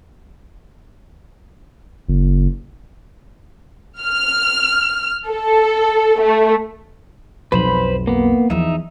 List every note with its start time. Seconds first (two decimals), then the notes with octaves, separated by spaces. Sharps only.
2.09 F#1
4.02 F6
5.28 A4
6.21 A3
7.52 B1 F2 B4 C5 B5
8.07 A#3 B3
8.50 E2 F3 D#4 E5